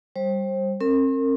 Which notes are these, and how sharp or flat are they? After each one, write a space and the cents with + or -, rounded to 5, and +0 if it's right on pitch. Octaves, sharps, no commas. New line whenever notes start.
G3 +0 C5 +30
C4 +45 A#4 -30